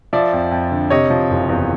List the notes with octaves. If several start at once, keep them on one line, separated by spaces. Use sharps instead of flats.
F3 D5 E5
F2
F2
D3
C3 C#5 D#5
F3
F#1
E2